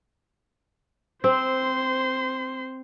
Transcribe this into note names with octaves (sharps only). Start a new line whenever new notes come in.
C4 C5 C6